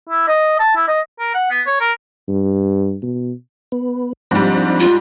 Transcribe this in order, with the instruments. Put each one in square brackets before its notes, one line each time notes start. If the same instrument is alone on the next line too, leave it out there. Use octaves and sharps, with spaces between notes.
[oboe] E4
D#5
A5
E4
D#5
A#4
F#5
B3
C#5
A#4
[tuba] G2
B2
[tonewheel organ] B3
[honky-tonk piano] G#2 G3 [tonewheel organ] F3 C4 D4
[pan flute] F4